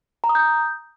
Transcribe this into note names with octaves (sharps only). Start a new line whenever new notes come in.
A#5
D#6
G6